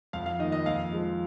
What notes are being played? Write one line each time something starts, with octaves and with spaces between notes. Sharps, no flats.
F2 F5
F5
D#3 A#3 D#5
D#5
F2 F5
F3 G#3